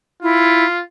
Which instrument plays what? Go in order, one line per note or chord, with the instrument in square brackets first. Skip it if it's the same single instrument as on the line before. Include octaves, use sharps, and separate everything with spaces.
[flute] E4 [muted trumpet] F4